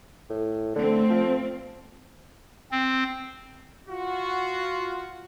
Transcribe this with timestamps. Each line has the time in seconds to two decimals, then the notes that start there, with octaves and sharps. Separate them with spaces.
0.30 A2
0.76 D3 A3 C4
1.10 F3
2.72 C4
3.89 F4 F#4